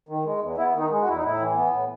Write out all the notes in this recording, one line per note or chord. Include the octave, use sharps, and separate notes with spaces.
D#3
G#3
E2
B3 E4
D#3
D#4
G#3
F#4
E2 E4
D#4
A2 E4
E3
B3
A2